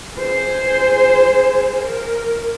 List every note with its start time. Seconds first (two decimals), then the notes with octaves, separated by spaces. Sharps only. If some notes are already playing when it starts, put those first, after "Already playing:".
0.17 G#4 C5
1.79 A#4